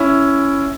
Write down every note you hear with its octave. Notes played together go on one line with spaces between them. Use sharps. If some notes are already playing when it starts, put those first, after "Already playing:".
Already playing: C#4 E4